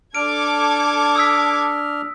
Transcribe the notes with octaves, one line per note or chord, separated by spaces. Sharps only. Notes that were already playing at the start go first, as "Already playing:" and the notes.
D4 A4 D6 F6 G#6 D7
D#6 E6 B6